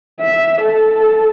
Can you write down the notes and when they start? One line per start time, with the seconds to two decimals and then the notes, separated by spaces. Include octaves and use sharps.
0.20 E5
0.63 A4